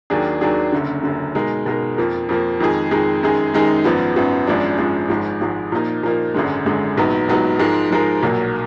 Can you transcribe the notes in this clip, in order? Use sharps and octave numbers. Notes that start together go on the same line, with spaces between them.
D#2 D#3 F#3 D4 G#4
D#2 D#3 F#3 D4 G#4
F#1 F#2 D3
F#1 F#2 D3
B2 G#3 D#4 A#4
B2 G#3 D#4 A#4
F2 F3 A#3
F2 F3 A#3
F2 D#3 G#3 D#4 G#4
F2 D#3 G#3 D#4 G#4
F#2 D#3 G#3 D#4 G#4
F#2 D#3 G#3 D#4 G#4
G#1 F#2 F3 B3
G#1 F#2 F3 B3
G#1 F#2 F3 G#3 D4
G#1 F#2 F3 G#3 D4
G#1 G#2 F3 G#3
G#1 G#2 F3 G#3
A#2 F3 A#3 D#4
A#2 F3 A#3 D#4
G#1 F#2 D3 G#3
G#1 F#2 D3 G#3
A#1 G#2 F#3 B3 D#4
A#1 G#2 F#3 B3 D#4
G#2 F3 G#3 D#4 A#4
G#2 F3 G#3 D#4 A#4
B1 A#2 F#3 A#3